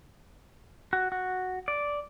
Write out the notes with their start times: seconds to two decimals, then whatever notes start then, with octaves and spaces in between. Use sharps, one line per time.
0.93 F#4
1.12 F#4
1.68 D5